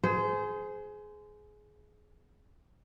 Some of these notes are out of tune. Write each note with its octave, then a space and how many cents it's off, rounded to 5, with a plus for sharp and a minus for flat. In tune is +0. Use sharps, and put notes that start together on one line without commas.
G#4 +20 C5 -20